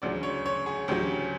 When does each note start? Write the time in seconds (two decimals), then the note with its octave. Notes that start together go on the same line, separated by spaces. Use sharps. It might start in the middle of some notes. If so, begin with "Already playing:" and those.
0.02 D2 C#3 F#3 D5
0.23 C#5
0.46 C#5
0.66 G#4
0.88 D2 C#3 F#3 G4